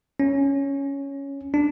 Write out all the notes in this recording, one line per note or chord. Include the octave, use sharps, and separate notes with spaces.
C#4
D4